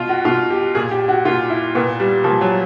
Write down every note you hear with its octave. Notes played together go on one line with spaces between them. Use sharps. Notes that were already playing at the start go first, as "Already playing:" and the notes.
Already playing: B2 F4
F#4
B2 F4
G4
A#2 G#4
G4
F#4
A#2 F4
E4
A#2 B3
G3
A#2 F3
F#3